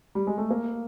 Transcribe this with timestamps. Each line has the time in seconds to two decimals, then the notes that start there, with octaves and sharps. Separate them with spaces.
0.15 G3
0.27 G#3
0.38 A3
0.50 A#3